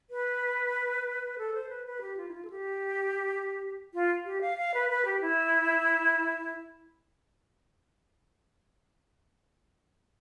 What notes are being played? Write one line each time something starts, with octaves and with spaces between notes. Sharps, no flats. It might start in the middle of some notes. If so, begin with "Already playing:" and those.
B4
A4
C5
B4
B4
G4
F4
E4
F4
A4
G4
F4
G4
F5
F5
B4
B4
G4
E4